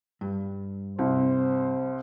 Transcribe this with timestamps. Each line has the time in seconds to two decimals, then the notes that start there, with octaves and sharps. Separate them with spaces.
0.21 G2
0.99 C2 C5